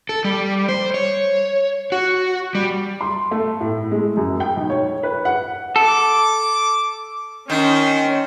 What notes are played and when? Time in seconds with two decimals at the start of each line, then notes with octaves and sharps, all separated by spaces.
0.09 A4
0.25 G3
0.69 C5
0.94 C#5
1.92 F#4
2.55 G3
3.01 C6
3.31 A3
3.60 A2
3.91 G#3
4.17 F#2
4.40 G5
4.57 B1
4.70 C#5
5.03 B4
5.25 F#5
5.76 A4 D6
7.50 D#3 C4 C#4 C5